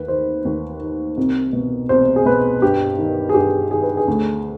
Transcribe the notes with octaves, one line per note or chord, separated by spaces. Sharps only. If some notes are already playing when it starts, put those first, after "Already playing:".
Already playing: D#2 B4
D#3 C5
D#2
D#3
C2
B2
C2 C5
G#4
B2 B4
G2 G4
D#3
G#4
G2 G4
D#3 G#4
B4
G#4
D2